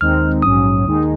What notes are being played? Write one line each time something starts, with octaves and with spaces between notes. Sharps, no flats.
D#2 D#3 G#3 C4 D#4 F6
A#1 G#2 F#3 C#4 D#6
D#2 D#3 G#3 D#4